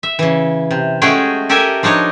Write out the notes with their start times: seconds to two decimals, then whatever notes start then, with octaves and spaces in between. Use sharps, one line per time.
0.03 E5
0.19 C#3 E3
0.71 C3
1.02 G#3 A3 C#4 F#4 G#4 G5
1.49 G4 A4 A#4 E5 G#5
1.83 F3 D4 D#4 C#5 D#5